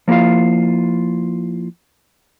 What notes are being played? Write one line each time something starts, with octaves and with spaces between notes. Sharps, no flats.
F3 A#3 E4 F4 F5